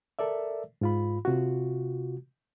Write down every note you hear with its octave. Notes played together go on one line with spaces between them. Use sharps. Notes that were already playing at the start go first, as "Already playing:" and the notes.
A4 A#4 D5 E5
G#2 F4 B5
C3 F4 F#4